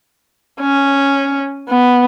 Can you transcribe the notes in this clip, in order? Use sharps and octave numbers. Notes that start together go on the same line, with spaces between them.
C#4
B3